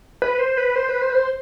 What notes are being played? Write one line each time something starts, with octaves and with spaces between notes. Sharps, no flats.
B4
C5
B4
C5
B4
C5
B4
C5